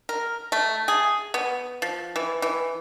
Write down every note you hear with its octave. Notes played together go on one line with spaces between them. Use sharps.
A#4
A3
G#4
B3
F3
E3
E3